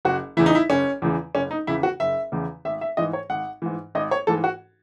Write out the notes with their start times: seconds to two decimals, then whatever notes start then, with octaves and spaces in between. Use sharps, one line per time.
0.05 F#1 F#4
0.37 E2 C#3 E3 E4
0.46 D#4
0.55 E4
0.70 F#1 C#4
1.02 E2 C#3 E3
1.35 F#1 C#4
1.51 D#4
1.67 E2 C#3 E3 E4
1.83 F#4
2.00 F#1 E5
2.32 E2 C#3 E3
2.65 G#1 E5
2.81 E5
2.97 G#2 E3 D#5
3.13 C#5
3.30 G#1 F#5
3.62 G#2 E3
3.95 G#1 D#5
4.11 C#5
4.27 G#2 E3 A4
4.44 F#4